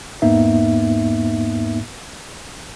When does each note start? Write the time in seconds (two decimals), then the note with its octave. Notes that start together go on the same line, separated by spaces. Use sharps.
0.22 E2 G#2 A#3 B3 D#4 E5